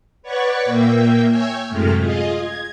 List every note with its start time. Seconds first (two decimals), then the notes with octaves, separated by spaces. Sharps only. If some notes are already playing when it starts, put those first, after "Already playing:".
0.22 B4 C#5 D5 F#5 C#6
0.65 A#2 A#3 E5 G5
1.28 C#5 E5 G5 G#5
1.69 F#2 A2 C3 G#3 A3 F6
2.00 F4 G#4 D#5
2.34 G#6